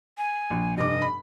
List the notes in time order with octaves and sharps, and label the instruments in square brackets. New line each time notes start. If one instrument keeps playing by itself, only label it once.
[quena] G#5
[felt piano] A#1
[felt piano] F1 G2 D6 [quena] D#5
[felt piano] B5